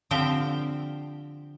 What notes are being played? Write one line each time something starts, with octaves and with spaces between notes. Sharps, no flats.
D3 F3 C4 G4 G5